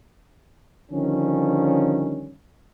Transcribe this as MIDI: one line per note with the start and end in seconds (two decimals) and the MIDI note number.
0.92 2.33 50
0.92 2.33 51
0.92 2.33 53
0.92 2.33 55
0.92 2.33 61